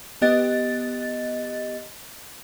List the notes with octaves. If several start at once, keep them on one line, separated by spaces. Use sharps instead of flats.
B3 G4 D#5 A6